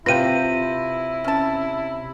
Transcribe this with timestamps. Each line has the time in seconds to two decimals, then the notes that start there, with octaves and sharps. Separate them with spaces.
0.06 C3 E4 F4 B4 F5 G5 A#6 D#7
1.24 C#4 A5